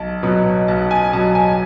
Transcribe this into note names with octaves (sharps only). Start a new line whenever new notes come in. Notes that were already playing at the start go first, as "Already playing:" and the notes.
Already playing: B1 A5
B2 F#3
B1 A5
G#5
B2 F#3 A5
G#5